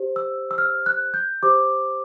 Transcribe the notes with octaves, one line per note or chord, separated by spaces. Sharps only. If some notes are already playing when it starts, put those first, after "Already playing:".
Already playing: G4 C5
E6
E6
F6
F#6
G6
G4 C5 D6